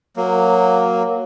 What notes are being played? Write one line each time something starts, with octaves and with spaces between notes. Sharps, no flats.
F#3 A#3